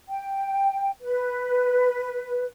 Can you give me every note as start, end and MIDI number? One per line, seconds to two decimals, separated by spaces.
0.08 0.90 79
1.02 2.47 71